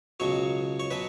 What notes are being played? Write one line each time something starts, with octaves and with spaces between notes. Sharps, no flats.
C#2 B2 F#3 C#5
C#5
B2 F#3 B4